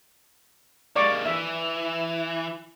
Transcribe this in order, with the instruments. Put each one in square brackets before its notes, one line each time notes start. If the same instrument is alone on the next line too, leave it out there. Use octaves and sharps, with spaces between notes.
[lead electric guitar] G#3 A#3 [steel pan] D5 C#6 D6
[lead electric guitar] E3 [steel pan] E5